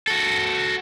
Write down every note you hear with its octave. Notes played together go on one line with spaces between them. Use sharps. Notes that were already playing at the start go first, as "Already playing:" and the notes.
F#4 A4